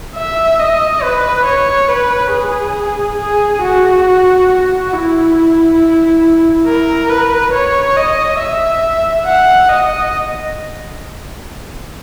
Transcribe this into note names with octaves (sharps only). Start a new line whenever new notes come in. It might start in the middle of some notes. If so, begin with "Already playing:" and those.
E5
D#5
B4
C#5
B4
G#4
G#4
F#4
F#4
E4
A#4
B4
C#5
D#5
E5
F#5
D#5